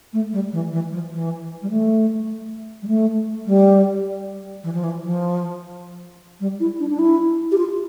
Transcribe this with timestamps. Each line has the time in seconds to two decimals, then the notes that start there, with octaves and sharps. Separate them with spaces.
0.13 A3
0.32 G3
0.52 E3
0.72 E3
0.92 F3
1.11 E3
1.62 G3
1.70 A3
2.82 G3
2.88 A3
3.46 G3
4.63 E3
4.74 F3
4.84 E3
5.03 F3
6.40 G3
6.60 E4
6.80 D4
6.90 D4
6.99 E4
7.52 G4
7.58 F4